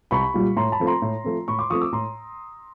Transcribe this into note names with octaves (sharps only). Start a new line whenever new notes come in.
C2 B5 C#6
A#2 G3
A2 A#5 C6
A5 B5
F3 A3 C4
A#5 C6
A2
F3 A3 C4
A2 B5 C#6
C6 D6
F3 A3 C4 C#6 D#6
D6 E6
A2 A#5 C6